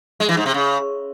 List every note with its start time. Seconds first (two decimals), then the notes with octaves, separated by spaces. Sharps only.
0.20 G#3
0.29 E3
0.37 G#2
0.46 C3
0.54 C#3